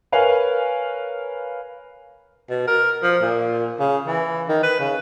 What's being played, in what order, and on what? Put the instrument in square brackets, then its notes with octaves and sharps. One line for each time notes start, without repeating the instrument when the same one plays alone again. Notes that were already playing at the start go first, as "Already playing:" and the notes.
[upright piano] A#4 B4 C#5 F5 G#5
[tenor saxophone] B2
A#4
F3
A#2
C#3
E3
D#3
B4
C#3